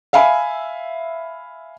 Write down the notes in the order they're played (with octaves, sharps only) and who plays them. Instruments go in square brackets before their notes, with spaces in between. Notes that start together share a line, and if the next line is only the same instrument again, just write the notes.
[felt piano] E5 F5 G#5 B5